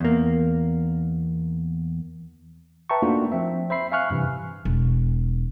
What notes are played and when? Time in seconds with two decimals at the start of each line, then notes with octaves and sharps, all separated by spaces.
0.01 E2 A#3
2.89 B4 E5 G5 A5 A#5 C#6
3.02 A3 A#3 D4 D#4 F4 F#4
3.32 F3 C4 E5
3.70 C5 E5 B5 C7
3.92 E5 F5 G#5 C#6 F6 F#6
4.10 G2 C3 E3
4.65 E1